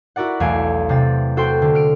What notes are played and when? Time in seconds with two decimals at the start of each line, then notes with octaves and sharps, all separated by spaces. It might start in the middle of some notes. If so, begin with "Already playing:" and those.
0.16 E4 F#4 A#4 D5 F#5
0.40 B1 E2 A3 F5 G#5 D7
0.89 C3 C4 A6
1.37 F#4 A4 C5 G5 C6
1.62 D3
1.75 F6 D7